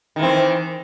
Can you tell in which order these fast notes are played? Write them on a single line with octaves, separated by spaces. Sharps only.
D#3 E3 C4